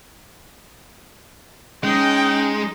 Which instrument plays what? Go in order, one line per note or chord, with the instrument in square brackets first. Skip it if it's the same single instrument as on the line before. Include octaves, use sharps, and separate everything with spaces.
[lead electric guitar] G#3 [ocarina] C#4 [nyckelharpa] D#4 D#5 [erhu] G5